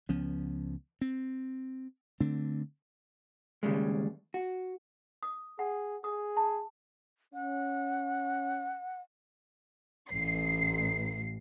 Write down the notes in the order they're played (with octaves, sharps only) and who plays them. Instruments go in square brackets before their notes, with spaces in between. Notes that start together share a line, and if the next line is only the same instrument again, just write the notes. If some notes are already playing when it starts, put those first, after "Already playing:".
[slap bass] C#2 F3 B3 C#4
C4
D3 A3 C4 D4
[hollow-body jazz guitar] D#2 A#2 C#3 G3 G#3
F#4
[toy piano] D#6
[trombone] G#4 [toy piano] F#5
[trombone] G#4 [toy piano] D#6
[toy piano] A5
[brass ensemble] C#4 [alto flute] F#5
[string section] A1 C7